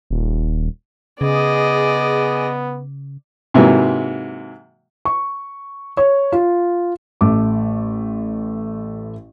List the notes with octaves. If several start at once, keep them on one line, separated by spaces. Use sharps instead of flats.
D#1
C#3 B3 G#4 D5 D#5
G#2 C3 E3 F#3 A#3
C#6
C#5
F4
A1 A3 D6